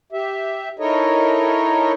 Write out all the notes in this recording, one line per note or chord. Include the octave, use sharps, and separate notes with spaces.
G4 E5
D#4 E4 A4 A#4 C#5 D#5